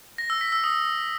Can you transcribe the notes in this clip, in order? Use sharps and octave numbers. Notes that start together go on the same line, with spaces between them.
A#6
E6
B6
E6
D#6